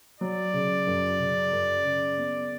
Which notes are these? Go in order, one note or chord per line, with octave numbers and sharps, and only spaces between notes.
F#3 D5
C#3
F#2
C#3
F#2
C#3
B3